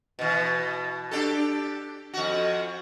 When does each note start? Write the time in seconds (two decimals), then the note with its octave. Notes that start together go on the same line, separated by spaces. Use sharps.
0.19 B2 E3
1.11 D4 G4 A4
2.14 F2 F#4